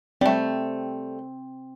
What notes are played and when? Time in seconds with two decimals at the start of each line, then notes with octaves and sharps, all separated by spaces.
0.21 G3 A3 C4